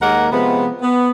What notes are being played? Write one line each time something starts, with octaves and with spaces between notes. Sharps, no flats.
D#2 G#3 A#3 A#4 F#5
C3 F3 G#3 B3
B3